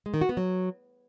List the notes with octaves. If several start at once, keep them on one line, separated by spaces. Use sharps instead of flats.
G#3
D#3
F#4
B3
F#3